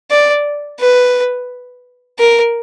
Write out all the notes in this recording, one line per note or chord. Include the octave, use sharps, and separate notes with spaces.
D5
B4
A#4